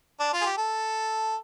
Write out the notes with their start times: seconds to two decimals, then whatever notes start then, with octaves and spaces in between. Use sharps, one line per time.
0.20 D4
0.33 F4
0.41 G#4
0.45 G4
0.57 A4